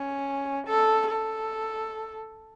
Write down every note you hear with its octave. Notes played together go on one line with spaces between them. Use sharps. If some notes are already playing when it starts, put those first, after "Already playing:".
Already playing: C#4
A4
A4